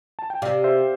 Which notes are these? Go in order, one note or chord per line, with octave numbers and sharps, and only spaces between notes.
A5
G5
C3 D5 F5
C5 E5